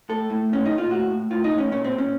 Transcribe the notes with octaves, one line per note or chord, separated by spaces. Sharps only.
A2 A4
A2
A#2 C#4
A#2 D#4
F4
A2 F#4
A2
A2 F4
D#4
A2
C#4
A#2 C#4
C4
A#2
C#4